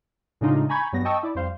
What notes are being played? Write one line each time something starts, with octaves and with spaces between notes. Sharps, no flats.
A2 C#3 G#3 D4 D#4 F4
G#5 A#5 B5 C#6 G6 G#6
G2 F#3 B3 A#6
D#5 G5 A5 C#6 E6
E4 D5
F2 G3 C5 F5